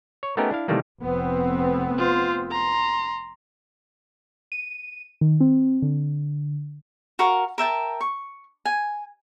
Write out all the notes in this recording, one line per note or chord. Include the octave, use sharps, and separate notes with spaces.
C#5
A3 B3 C#4 D#4 G4 A#4
D4 E4 F5
C3 D#3 E3 G3 A3 A#3
F1 B3 C4
F4 C5
A#5 C6
D#7
D#3
C4
D3
F#4 A#4 F5
A#4 E5 G5 A5
C#6
G#5